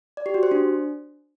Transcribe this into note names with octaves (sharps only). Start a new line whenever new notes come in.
D5
G4
F#4
C5
D4